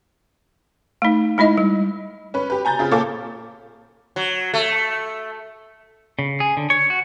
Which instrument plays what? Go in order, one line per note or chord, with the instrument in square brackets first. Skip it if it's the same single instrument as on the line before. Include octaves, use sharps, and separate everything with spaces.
[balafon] A3 D#4
G#3 D#4 E4 D#5
G3
[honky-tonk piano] C#4 B4
G4 B4
G#5 A#5 G6 A6
C#3 C4 F4 G#4
A#2 A4 C#5 F5 D6 A6
[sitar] F#3
A3
[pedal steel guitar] C#3
G#4
D3
C#5
F#4